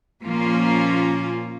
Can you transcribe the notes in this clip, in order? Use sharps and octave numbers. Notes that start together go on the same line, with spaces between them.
A#2 F3 A#3 C#4 F4